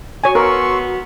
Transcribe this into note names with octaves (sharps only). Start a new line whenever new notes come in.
F#4 C#5 G#5
B3 A#4 C6 C#6 E6